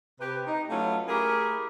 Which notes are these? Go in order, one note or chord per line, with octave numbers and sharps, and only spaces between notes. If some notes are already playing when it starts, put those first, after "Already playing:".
C3 G4 B4
D#4
F#3 A3 B3 C#4 E4 F4
A3 E4 G4 G#4 A#4